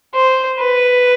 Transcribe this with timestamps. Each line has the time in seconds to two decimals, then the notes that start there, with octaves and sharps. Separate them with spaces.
0.14 C5
0.59 B4